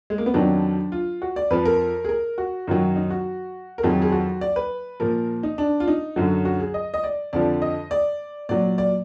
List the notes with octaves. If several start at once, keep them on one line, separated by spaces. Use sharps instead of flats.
G#3
A#3
B3
F2 D#3 F#3 D4
F4
F#4
D5
F2 F3 B4
A#4
G#4
A#4
F#4
F#2 D#3 F#3
D#4
F#4
A#4
F2 D#3 F#3 G#4
G#4
F#4
D5
B4
A#2 F3 A#4
D#4
D4
F4
D#4
F#2 D3 F#3
F#4
G#4
D#5
D#5
D5
F2 D3 F3 D5
D#5
D5
A#2 F#3 D5
D5